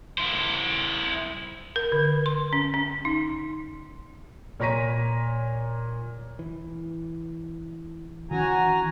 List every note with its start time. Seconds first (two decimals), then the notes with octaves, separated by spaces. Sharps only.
0.18 E4 C5
1.76 A#4
1.92 D3
2.26 C6
2.53 C#4
2.74 C#4
3.05 D#4
4.60 A#2 C#5 A#5 A#6 B6 D#7
6.39 E3
8.31 D#3 E3 C#4 F#4 G#5 A#5